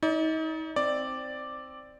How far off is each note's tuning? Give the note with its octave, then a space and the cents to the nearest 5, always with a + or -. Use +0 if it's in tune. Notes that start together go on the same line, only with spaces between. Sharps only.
D#4 +35 D5 -20
C4 +0 D5 +0